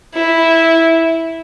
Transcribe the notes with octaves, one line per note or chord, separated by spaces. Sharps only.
E4